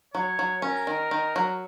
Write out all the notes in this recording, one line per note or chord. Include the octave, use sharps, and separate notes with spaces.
F#3 C#5
F#3
C#4 A#4
D#3
D#3
F#3